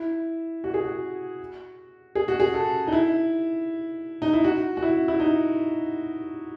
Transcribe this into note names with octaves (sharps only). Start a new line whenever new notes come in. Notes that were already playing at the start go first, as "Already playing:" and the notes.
Already playing: E4
F#4
G#4
F#4
G#4
F#4
G#4
A4
D#4
E4
D#4
E4
F#4
F#4
E4
E4
D#4